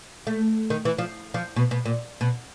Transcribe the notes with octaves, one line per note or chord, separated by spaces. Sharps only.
A3
D#3
E3
F3
F3
B2
B2
A#2
B2